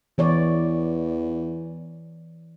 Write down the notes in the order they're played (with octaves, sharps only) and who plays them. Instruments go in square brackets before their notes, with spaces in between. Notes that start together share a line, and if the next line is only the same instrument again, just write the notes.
[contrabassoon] E2 [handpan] E3 C#5 D5